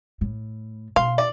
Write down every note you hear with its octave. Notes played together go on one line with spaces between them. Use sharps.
A2
B2 F5 C6
D5